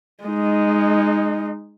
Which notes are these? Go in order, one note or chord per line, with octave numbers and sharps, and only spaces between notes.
G#3 D#4